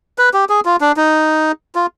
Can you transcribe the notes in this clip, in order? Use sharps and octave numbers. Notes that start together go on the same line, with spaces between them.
B4
G4
G#4
F4
D4
D#4
F4